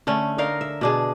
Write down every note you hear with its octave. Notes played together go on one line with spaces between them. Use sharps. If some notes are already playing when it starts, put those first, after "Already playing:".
D3 A3 C#4
D3 D#4 A#4 F5
E5
B2 D4 G#4